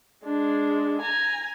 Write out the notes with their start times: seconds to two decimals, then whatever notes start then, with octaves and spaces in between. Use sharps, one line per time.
0.24 G#3 D4
1.01 G#5 A#5